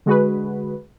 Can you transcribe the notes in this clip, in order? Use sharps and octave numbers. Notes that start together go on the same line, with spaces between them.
D3 G#3 F#4 G#4 B4